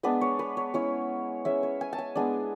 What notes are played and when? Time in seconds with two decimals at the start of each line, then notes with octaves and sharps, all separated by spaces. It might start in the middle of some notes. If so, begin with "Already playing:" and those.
0.03 G#3 B3 D4 B4
0.21 C#5
0.39 B4
0.57 C#5
0.74 G#3 C#4 E4 C#5
1.45 G#3 C#4 E4 E5
1.63 C#5
1.81 G#5
1.93 A5
1.98 G#5
2.15 G#3 B3 D4